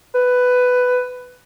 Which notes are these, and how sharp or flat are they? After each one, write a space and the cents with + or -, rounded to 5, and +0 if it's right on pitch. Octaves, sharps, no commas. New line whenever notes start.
B4 +10